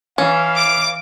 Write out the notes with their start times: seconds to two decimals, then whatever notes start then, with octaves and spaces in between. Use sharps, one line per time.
0.18 E3 C#4 F5
0.57 D6